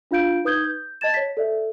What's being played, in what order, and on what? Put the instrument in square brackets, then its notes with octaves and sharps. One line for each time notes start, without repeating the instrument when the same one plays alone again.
[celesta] D4 F4 F5 G6 D7
D#4 B4 D#6 G6 G#6 G7
G6
D#5 A5 G#6 A6 E7
C#5 B6
A4 D5 E5